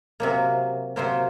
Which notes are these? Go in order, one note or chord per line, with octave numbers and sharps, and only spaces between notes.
C3 F#3 A#3
C3 F#3 A#3 C5